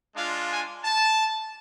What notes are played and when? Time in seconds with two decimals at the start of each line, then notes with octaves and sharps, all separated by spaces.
0.16 G#3 D4 F4 F5
0.51 G#5
0.84 A5